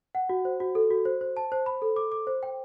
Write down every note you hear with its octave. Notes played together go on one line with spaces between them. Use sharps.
F#5
F#4
C5
F#4
A4
F#4
C5
C5
A5
C5
B5
A4
D6
D6
C5
G5